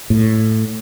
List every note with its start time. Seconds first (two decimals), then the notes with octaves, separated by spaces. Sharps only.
0.10 A2